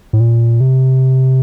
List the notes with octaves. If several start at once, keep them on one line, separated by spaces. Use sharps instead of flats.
A2
A#2
C3